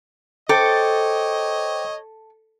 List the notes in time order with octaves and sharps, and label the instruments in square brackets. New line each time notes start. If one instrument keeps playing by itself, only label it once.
[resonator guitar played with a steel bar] A4 [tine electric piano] C5 G5 D6 [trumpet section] C#5 D#5